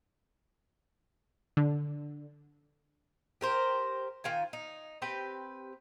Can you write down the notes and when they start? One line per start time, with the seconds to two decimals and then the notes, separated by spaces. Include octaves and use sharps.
1.57 D3
3.41 G4 A#4 C5
4.24 D#3 F4 G5 G#5
4.53 D#4
5.02 C4 G4 B4 G5